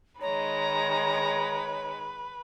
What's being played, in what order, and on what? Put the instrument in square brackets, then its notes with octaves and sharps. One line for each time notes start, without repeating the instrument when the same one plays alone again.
[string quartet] D#3 G#3 D#4 [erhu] B4 [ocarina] C#5 [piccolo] A#5